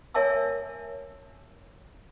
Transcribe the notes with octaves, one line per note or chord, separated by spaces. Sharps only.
A#4 C#5 E5 G#5 A5 E6